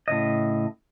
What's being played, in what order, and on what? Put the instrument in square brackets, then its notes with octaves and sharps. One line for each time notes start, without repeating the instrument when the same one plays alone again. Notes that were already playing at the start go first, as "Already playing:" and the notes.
[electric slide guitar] A2 C#3 D#5